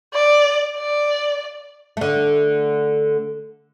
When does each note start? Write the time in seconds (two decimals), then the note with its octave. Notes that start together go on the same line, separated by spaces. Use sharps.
0.14 D5
0.77 D5
1.97 D3 A3